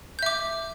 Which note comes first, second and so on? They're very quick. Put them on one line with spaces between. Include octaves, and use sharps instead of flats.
G6 E5 D6